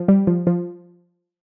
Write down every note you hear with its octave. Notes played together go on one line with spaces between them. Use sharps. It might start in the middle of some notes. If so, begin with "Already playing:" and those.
Already playing: F3
G3
F3
F3